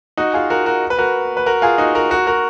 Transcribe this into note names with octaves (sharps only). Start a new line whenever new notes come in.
D#4 F#4
F4 G#4
F#4 A#4
F#4 A#4
B4
F#4 A#4
B4
F#4 A#4
F4 G#4
D#4 F#4
F#4 A#4
F#4 A#4
F#4 A#4